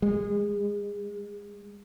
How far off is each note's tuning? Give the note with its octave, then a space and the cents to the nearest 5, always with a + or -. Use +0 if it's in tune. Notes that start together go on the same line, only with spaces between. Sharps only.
G#3 -30